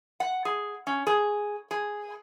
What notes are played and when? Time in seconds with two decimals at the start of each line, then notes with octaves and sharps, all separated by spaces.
0.20 F#5
0.45 G#4
0.87 C#4
1.07 G#4
1.71 G#4